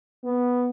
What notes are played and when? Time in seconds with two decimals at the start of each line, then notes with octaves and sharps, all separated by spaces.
0.24 B3